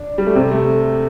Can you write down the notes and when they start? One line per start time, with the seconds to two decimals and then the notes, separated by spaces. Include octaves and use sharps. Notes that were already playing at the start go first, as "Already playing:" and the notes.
Already playing: D4
0.18 G3
0.26 A3
0.35 C3 C4
0.51 A3